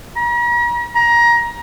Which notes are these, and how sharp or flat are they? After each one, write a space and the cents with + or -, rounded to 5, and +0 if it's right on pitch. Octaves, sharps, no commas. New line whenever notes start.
A#5 +45
A#5 +20